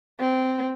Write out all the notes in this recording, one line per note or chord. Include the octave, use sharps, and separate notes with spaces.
C4